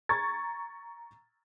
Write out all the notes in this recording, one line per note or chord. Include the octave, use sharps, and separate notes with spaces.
A#5 C#6 G#6 A6